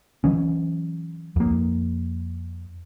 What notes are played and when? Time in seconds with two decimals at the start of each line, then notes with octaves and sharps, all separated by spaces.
0.24 E3 F#3 C#4
1.36 F2 A#3